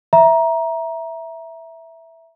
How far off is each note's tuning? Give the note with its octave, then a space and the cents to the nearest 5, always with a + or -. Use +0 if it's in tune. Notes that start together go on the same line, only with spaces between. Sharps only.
E5 +0 A#5 +15